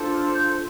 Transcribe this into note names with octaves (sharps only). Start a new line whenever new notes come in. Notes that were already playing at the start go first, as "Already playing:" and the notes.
Already playing: D4 F4 A4 C5
F6
G6